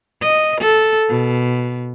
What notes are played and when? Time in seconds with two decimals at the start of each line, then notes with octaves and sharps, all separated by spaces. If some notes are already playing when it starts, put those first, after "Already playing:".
0.21 D#5
0.60 A4
1.08 B2